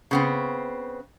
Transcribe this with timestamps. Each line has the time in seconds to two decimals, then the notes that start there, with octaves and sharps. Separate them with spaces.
0.11 C#3 B3 C4